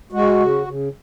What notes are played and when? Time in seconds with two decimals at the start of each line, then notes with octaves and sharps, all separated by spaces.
0.12 G#3 F#4
0.40 C#3
0.67 C#3